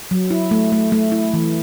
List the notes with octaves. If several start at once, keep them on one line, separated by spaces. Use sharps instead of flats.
F#3
E4
A3
A3
A3
E4
E3